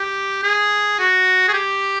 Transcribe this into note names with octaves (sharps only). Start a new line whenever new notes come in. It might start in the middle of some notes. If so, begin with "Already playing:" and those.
Already playing: G4
G#4
F#4
G#4
G4